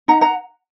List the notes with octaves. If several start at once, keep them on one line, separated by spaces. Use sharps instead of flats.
D#4 F#5 A#5
F#5 A#5